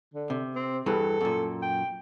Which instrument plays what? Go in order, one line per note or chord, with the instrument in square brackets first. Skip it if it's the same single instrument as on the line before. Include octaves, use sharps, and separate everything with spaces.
[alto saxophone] D3
[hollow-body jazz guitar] C3
[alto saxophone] C4
[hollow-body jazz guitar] E2 G2 E3 [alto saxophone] A4
[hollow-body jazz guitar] F#2 A#2
[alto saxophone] G5